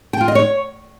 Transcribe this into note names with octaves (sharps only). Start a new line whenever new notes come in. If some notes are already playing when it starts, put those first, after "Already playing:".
G5
F4
D#5
C#5